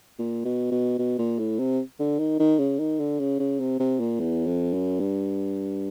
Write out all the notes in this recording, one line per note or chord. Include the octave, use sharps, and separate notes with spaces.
A#2
B2
B2
B2
A#2
A2
C3
D3
D#3
D#3
C#3
D#3
D3
C#3
C#3
C3
C3
A#2
E2
F2
F#2
G2